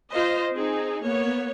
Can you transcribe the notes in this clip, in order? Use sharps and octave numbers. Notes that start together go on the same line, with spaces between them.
F4 C5 D#5
C4 D#4 G#4
A#3 B3 C#5